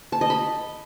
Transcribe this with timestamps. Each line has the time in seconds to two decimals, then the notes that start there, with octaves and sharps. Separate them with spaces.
0.12 A5
0.21 D#5
0.30 B5